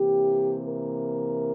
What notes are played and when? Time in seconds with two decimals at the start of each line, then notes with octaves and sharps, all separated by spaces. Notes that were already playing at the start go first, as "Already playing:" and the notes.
Already playing: C3 E3 A#3 G4
0.67 A#4